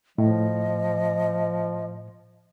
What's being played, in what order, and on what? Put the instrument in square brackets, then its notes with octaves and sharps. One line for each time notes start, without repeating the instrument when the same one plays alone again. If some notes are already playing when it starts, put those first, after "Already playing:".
[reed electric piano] A2 [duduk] F3 [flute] D#5